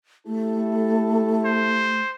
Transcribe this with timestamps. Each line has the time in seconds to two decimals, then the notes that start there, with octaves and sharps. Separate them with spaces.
0.27 A3 E4 G4 A4
1.45 C5